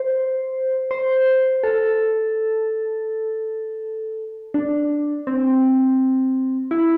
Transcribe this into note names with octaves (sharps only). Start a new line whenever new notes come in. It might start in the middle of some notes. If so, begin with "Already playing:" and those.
Already playing: C5
C5
A4
D4
C4
E4